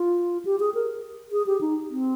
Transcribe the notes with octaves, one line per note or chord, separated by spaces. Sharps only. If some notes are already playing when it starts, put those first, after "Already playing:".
Already playing: F4
G4
G#4
A#4
G#4
G4
D#4
C4